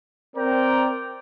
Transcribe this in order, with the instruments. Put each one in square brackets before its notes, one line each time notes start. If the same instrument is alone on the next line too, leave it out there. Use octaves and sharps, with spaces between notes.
[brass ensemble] C4 A#4 D5 G5 A#5